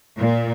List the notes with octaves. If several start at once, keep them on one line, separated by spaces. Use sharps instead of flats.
A#2